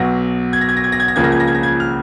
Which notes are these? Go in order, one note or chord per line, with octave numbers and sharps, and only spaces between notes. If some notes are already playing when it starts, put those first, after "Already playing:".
Already playing: B1 B2 F#3 A#6
G#6
A#6
G#6
A#6
G#6
A#6
G#6
A#6
C#2 C#3 F3 A#3 C#4 G#6
A#6
G#6
A#6
G#6
A#6
G#6
F6